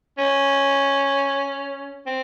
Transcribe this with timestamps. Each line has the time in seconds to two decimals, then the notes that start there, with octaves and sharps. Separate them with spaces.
0.18 C#4
2.06 C4